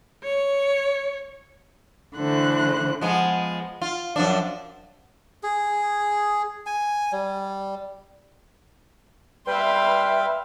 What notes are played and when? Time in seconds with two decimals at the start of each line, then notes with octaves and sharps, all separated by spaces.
0.23 C#5
2.15 D3 E3 A3 C5 F#6
3.01 F3 G#3 B3
3.82 F4
4.16 F#2 F3 D4
5.43 G#4
6.66 G#5
7.12 G3
9.47 G3 B4 E5 F5 G5 C6